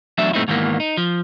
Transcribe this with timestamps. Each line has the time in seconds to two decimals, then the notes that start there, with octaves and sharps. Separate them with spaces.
0.18 E2 F#3 A3 D4 E5
0.33 G2 A#2 A3 C4 D#4 E4
0.48 G#2 D#3 E3 G3 A#3 B3
0.80 D#4
0.97 F3